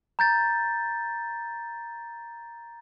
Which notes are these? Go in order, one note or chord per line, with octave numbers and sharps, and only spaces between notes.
A#5 G6 A6